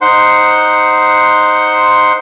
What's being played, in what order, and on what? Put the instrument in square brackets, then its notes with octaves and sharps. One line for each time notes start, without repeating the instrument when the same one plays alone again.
[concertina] D#4 C5 F#5 C6